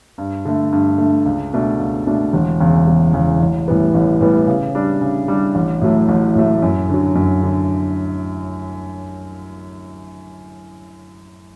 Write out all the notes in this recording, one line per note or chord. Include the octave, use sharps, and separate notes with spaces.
G2
D3 A3
G2
D3 A3
C#2
B2 A3 D4
C#2
B2 A3 D4
E1
E2 C#3
E1
E2 C#3
A1
A2 E3 G3 B3
A1
A2 E3 G3 B3
C#3
G3 D4
C#3
G3 D4
A1
A2 F#3 A3
A1
A2 F#3 A3
F#2
D3 F#3
F#2
D3